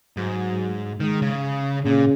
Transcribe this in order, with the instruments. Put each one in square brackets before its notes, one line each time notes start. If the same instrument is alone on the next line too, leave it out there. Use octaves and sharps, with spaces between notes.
[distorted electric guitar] G#2 [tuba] F#3
[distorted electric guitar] D#3 [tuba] G#3
[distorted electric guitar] C#3
[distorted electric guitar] A#2 [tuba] C#3